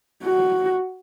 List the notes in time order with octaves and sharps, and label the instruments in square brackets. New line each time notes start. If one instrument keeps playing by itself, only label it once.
[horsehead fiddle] F#4